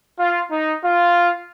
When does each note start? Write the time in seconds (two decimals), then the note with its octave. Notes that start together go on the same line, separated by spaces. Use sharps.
0.17 F4
0.49 D#4
0.82 F4